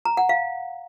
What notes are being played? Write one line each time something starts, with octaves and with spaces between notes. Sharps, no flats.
A#5
F#5
F5